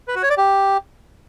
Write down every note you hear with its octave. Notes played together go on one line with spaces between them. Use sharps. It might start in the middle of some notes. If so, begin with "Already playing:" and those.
B4
F#4
C#5
D5
G4